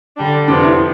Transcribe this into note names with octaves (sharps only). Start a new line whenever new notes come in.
D3 G3 D4
F2 C3 F3 B3 D4
E4